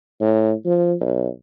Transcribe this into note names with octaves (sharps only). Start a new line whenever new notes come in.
A2
F3
B1